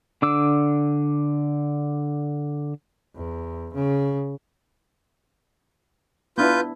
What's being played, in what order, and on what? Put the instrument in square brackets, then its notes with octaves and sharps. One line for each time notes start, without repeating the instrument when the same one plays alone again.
[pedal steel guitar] D3 D4 D6 E6
[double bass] E2
C#3
[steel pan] B3 D4 E4 [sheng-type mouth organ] F4 B4 G6